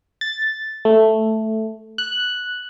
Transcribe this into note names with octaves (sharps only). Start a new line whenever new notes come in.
A6
A3
F#6